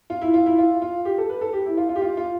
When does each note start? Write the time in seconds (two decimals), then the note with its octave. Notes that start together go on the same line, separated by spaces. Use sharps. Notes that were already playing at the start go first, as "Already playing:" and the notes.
0.10 F4
0.21 E4
0.34 F4
0.46 E4
0.58 F4
0.82 F4
1.05 G4
1.18 A4
1.29 B4
1.41 A4
1.53 G4
1.66 E4
1.77 F4
1.89 F4
1.96 G4
2.01 F4
2.17 F4